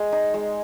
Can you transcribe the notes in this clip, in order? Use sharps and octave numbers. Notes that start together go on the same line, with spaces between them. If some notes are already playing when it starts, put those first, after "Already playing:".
Already playing: G#3
D#4
G#3